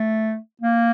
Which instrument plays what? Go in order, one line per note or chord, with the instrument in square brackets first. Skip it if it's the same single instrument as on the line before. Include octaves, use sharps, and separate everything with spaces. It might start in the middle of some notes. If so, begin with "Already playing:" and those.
Already playing: [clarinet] A3
A#3